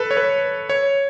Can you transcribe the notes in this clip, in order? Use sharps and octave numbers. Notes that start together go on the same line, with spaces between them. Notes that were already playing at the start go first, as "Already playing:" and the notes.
Already playing: A4 B4
C#5
B4
C#5